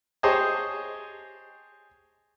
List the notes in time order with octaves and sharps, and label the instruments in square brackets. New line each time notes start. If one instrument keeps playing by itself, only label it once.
[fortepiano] G4 G#4 C5 C#5 D#5 A5